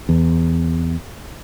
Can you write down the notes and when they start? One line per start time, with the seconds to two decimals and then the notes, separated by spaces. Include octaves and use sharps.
0.09 E2